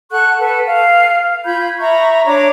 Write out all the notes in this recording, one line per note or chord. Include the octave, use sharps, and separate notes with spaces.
A4 F#5 C#6 F#6
A4 B4
F5
F4 B5 G6 G#6
E5 A#5 B5 C#6
D4 C#5 A#5 D6